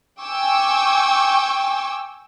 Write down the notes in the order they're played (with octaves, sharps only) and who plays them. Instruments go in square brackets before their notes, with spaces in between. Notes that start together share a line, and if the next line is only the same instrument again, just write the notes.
[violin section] G5 G#5 C#6 D6 E6